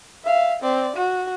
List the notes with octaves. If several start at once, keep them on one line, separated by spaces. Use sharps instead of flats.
E5 F5
C4 D5
F#4